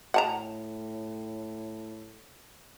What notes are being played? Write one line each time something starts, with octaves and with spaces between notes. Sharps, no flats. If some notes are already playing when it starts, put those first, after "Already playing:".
A2 F#5 A5 A#5